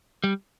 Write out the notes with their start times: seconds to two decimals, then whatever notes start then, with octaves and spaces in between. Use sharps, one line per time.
0.24 G3